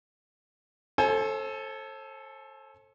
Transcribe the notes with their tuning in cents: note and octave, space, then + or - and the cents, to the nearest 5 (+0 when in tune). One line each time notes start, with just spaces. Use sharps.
A4 +0 C5 +40 G#5 +35